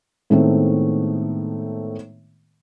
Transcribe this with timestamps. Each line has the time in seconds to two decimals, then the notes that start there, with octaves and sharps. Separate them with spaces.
0.30 A2 D#3 G#3 A3 B3 C4